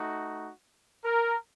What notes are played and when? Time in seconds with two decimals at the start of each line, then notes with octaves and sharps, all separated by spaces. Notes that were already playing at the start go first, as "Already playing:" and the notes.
Already playing: A3 D#4 F#4
1.04 A#4